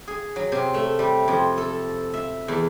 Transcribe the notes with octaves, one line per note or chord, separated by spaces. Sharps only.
G#4
F#3
C3
A3
G3
F2
A4
E5
E2